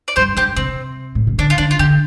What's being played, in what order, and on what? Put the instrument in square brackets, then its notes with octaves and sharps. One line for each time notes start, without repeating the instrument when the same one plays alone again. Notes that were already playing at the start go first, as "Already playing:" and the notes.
[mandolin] D5
[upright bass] G2 [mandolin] G4 C5
[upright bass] G2 [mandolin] G4 C5
[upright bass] C3 [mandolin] C4
[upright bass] A2
C3
[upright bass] D3 [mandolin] D4
[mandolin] F4
[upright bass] D3 [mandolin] D4
[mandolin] F4
[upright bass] D3 [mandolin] G4